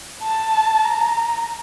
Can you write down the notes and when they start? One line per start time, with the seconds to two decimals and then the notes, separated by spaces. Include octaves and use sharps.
0.23 A5
0.85 A#5